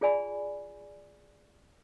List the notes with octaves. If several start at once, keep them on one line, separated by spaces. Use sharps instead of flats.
F4 G#4 D5 G#5 B5